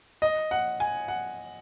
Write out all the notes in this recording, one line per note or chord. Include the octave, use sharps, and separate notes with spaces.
D#5
F#5
G#5
F#5